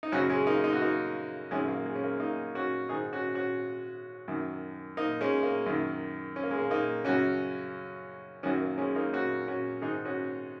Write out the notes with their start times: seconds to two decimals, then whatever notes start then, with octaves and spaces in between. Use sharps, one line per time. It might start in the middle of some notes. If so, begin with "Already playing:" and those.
0.03 D#4
0.12 F#2 C#3 C#4 F#4
0.29 G#3 C#4
0.47 A#3 D#4
0.64 D#4
0.73 F#4
0.81 A#3 D#4
1.51 F#2 D#3 G#3 C#4
1.68 A#3
1.86 G#3
1.95 C#4
2.04 A#3
2.20 A#3 D#4
2.55 C#4 F#4
2.89 G#2 D#3 D#4 G#4
3.13 C#4 F#4
3.35 C#4 F#4
4.28 F#2 D#3
4.97 A#3 D#4
5.21 G#3 C#4
5.43 A#3
5.66 F#2 D#3
6.36 C#4
6.43 A#3
6.51 G#3
6.58 A#3
6.70 A#3 D#4
7.05 F#2 C#3 C#4 F#4
8.43 F#2 D#3 C#4 F#4
8.60 A#3
8.78 G#3 C#4
8.95 A#3 D#4
9.13 C#4 F#4
9.48 C#4 F#4
9.82 G#2 D#3 D#4 G#4
10.05 C#4 F#4